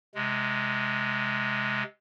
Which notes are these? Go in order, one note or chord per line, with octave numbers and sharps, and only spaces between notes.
C3 G#3